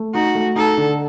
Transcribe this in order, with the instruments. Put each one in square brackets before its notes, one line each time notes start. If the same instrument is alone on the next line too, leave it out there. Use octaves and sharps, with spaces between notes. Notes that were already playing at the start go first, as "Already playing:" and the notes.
Already playing: [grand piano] A3
[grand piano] D#4 [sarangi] F#4
[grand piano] A3
[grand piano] D#4 [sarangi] A4
[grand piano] D3